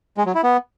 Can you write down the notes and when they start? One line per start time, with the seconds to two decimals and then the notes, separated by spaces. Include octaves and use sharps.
0.17 G#3
0.26 F#3
0.35 E4
0.44 B3